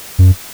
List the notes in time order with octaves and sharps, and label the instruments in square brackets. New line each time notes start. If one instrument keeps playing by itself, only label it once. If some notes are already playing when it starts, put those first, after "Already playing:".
[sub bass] F#2